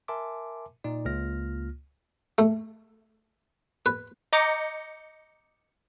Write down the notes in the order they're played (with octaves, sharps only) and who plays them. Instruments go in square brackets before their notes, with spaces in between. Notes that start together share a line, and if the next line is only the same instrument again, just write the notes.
[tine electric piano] A#4 E5 G#5 A5 C6 D6
A#2 D#4 D5
C#2 A#3 F4 F6 A#6
[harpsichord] A3
B4
[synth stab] D#5 A#5 D6 G6 A#6 C#7